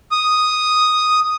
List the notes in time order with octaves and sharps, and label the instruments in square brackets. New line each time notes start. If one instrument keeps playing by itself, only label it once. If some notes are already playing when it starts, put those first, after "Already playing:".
[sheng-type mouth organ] D#6